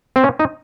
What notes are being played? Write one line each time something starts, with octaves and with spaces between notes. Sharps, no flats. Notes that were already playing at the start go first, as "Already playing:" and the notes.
C4
C#4
D#4